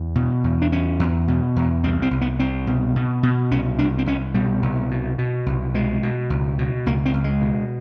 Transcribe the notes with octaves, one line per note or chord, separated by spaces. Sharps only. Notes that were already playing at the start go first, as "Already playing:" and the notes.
Already playing: E2
B2
E2
D4
E2 C#4
E2
B2
E2
C2 C4
C4
C2
B3
C2 C4
B2
B2
B2
C2 C#4
C2 D4
C4
C2 C#4
B2 G3
C2
B2
B2
C2
B2 G#3
B2
C#2
B2
C#2 A#3
C4
C#2
G#3
B2